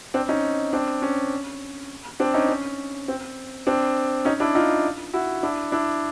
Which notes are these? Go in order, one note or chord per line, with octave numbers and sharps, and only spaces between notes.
C4 D4
C#4 D#4
C4 D4
C#4
C4 D4
C#4 D#4
C#4
C4
C4 D4
C#4 D#4
D4 E4
D#4 F4
E4 F#4
D4 E4
D4 E4